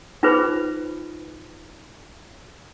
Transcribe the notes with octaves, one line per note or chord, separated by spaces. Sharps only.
D#4 F4 G#4 B4 C5